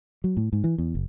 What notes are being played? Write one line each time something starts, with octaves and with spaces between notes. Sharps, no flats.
F#3
A2
G#2
E3
E2
F#1